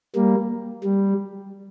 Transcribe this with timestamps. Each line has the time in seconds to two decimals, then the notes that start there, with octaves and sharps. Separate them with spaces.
0.15 G3 A#3
0.83 G3